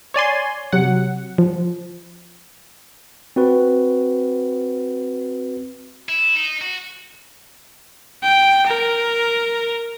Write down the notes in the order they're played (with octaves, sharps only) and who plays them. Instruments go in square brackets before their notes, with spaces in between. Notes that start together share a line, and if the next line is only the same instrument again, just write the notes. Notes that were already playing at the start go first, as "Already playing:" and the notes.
[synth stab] C#5 D5 G#5 C6
C3 F#3 F#5
F3
[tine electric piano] C4 F#4 B4
[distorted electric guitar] E4
D#4
F#4
[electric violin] G5
A#4